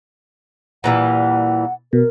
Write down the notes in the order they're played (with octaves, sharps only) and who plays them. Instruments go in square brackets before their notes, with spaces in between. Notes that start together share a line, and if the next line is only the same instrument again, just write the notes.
[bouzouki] A#2 E3 G3 [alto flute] F#5
[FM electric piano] B2 [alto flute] A#4